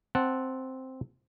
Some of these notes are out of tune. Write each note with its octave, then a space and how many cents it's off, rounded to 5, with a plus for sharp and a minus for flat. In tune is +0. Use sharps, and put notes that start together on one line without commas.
C4 +0 F#5 +0 A5 +0